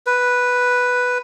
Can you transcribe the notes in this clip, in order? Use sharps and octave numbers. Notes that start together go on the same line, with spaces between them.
B4